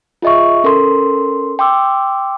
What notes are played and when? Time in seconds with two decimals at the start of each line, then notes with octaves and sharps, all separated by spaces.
0.22 F4 G#4 D#5 E5 C#6
0.64 C#4 A4 A#4 C6
1.59 G5 C6 D6 E6